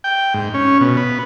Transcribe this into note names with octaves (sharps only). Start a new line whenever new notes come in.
G5
G#2
C#4
B2
B3